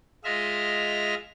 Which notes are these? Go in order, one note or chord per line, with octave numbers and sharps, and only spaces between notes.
G#3 F4 D#5 E5 F6